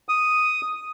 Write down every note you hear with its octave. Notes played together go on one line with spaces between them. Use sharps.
D#6